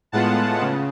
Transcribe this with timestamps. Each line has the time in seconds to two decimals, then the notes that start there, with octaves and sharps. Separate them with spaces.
0.12 A2 G#3 B3 F4 F#5 A5
0.61 C#3